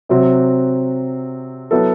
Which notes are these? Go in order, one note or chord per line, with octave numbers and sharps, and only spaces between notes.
C3 F#3 C4 F#4
F#3 B3 E4 A4